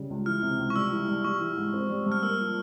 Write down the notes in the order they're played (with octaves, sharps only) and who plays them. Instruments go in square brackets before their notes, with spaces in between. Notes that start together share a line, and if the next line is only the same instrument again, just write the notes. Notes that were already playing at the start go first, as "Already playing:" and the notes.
Already playing: [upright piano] C#3 G3
C#2
[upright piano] E3 [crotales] F6
[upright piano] C3
C#2
[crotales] C#6
[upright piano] G3 [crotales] E6
[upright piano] E3
G2
[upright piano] G3 [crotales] C#6
[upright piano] E3
G#2
C4
G3
G2
[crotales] F6
[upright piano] A#3 [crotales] E6
[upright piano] F3